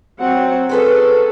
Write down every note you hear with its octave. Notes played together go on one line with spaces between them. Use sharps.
F#3 C4 F#5
C#4 G#4 A4 B4 C5